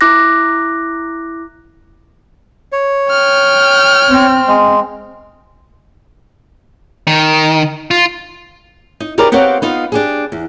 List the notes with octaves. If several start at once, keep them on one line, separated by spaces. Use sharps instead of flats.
E4 D6 F#6 A#6
C#5
G5 F6
C4
G#3
D#3
F4
D#4
D#4 G4 G#4 A#4 B4 D5
B3 C4 G4 C#5 F5 F#5
B3 D#4 F4 F5
D4 G4 G#4
E2